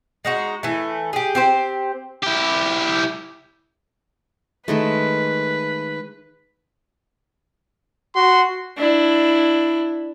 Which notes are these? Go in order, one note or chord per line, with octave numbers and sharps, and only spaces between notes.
G#3 D#4 F#4
E3 A3
G4 G#4
C4 G4 C5
E4 G4
D#3 G#3 A3 B4
F#4 C6
D4 E4